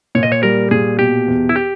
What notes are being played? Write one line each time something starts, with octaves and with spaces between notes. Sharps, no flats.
A#2 C#5
D#5
C#5
G3 A#4
A#2 G#4
B2 G4
E2
E4
G4